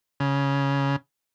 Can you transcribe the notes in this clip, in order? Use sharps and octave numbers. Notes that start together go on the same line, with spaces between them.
C#3